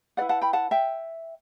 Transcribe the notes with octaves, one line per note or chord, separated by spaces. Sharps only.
E4 B4 D5 F#5
F#5 A5
G5 B5
F#5 A5
E5 G5